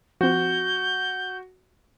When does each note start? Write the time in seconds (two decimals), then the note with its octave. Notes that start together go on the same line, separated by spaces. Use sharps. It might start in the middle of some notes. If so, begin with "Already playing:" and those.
0.21 F3 C4 F#4 G6